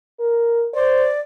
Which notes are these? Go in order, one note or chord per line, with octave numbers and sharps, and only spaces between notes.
A#4
C5 D5